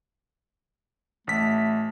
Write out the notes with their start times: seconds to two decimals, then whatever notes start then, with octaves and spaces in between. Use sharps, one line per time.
1.27 A1 A3 B6